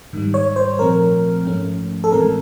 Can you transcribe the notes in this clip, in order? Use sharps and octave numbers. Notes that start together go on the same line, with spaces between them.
G#2 D#3 G3
C#5
C5
A#2 F3 A3 C4 A#4
G#2 F3 A3 C#4
A4
A2 E3 G#3 C4 A#4